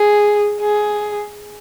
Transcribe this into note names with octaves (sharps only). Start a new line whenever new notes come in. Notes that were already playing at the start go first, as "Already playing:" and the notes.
Already playing: G#4
G#4